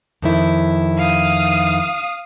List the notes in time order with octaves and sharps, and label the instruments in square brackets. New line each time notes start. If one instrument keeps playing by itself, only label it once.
[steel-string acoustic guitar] F2 D#3 E4
[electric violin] F5 D#6